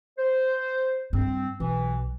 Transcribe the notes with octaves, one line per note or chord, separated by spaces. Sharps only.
C5
G2 C4
B1 E3